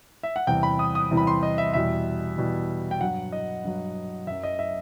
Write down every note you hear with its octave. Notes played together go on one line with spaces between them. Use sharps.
E5
F#5
E2 C3 E3 G3 G5
B5
D#6
D#6
E2 C3 E3 G3
B5
C6
D#5
E5
E2 B2 G3 E5
E2 B2 G3
G5
G2 F#3 F#5
D#5
G2 F#3
F#2 F#3 E5
D#5
E5